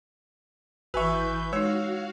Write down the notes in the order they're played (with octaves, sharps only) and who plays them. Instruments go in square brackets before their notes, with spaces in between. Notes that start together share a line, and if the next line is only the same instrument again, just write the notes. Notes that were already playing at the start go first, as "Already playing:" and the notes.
[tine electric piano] G#1 G#5 C#6 [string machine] E3 G6 [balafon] F#4 [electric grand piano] B4 E5
[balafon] G#3 D#4 [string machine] F#4 F5 [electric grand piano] C#5 [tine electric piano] E6